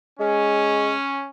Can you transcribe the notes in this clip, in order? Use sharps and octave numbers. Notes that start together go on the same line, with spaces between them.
G#3 C#4